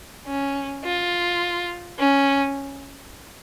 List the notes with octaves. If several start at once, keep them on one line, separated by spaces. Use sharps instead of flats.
C#4
F4
C#4